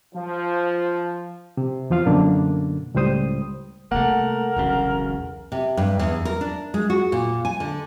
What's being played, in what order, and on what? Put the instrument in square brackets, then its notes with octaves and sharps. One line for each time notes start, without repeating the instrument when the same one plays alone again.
[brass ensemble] F3
[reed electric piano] C3
E2 F3 F4 F5
F#2 B2 D3 A#3 D4
C#2 A2 G3 C5 D#6
[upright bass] C3 G3 [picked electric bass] A3 A#3 [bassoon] A#4 [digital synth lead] F#5
[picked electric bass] E1 B1 C#3
[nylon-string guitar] C3
G2
E2
A#4
D4
G#3
F#4
A#2
G#5
D3